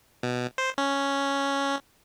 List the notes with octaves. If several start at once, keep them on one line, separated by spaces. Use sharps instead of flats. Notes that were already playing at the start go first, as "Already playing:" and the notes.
B2
C5
C#4